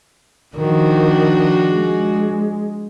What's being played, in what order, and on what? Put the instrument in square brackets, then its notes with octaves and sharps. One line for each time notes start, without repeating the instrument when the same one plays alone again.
[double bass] D#3 [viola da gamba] F3 D4 F#4
[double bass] G#3